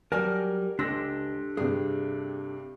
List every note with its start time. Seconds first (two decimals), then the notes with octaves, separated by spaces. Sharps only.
0.12 F#3 G3 A#4 G#5 A5 F6
0.79 C#2 D4 G4 A4 C6 E6 A#6
1.57 G2 C3 G#4